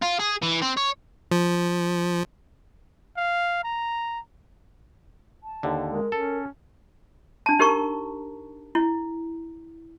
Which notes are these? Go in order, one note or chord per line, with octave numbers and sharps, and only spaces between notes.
F4
G#4
E3
C4
C#5
F3
F5
A#5
A5
D#2 D3
G#3 A#4
C#4 A4
D4 A5
D#4 G4 A#4 A#5 C#6
E4